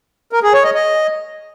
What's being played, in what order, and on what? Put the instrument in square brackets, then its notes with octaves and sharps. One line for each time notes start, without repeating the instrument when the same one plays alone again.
[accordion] A#4
G#4
C#5
D#5
D#5